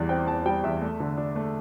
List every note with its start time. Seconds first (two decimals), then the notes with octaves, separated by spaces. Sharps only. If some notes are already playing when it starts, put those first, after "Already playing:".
Already playing: E2 E3 G3 D5
0.09 C4 G5
0.27 E2 A5
0.45 G3 G5
0.63 E2 E5
0.82 A3
1.00 D3
1.17 D4
1.36 A3